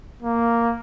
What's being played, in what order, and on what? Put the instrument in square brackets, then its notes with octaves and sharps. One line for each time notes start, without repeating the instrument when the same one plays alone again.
[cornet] A#3